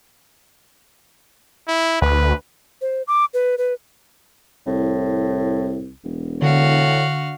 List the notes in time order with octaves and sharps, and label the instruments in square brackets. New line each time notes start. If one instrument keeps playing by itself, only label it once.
[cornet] E4
[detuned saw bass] D2 [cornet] B4
[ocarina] C5
D6
B4
B4
[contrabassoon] C2 [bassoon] A2
[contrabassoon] E1
[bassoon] A2 [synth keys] D3 [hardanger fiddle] F#4 F5